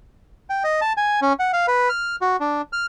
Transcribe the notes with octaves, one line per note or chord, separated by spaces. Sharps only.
G5
D#5
A5
G#5
C#4
F#5
F5
B4
F6
F#4
D4
F6